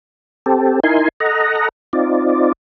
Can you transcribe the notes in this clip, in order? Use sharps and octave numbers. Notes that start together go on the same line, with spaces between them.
C4 G4 A4
D#4 E4 A#4 G#5 C6
A4 D#5 F#5 A#5
C4 D#4 F4 D5